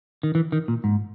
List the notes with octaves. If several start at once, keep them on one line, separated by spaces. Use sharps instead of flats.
D#3
E3
D#3
A#2
G#2